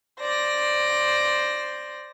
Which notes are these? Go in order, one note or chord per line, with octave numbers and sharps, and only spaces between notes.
C5 D5 A#6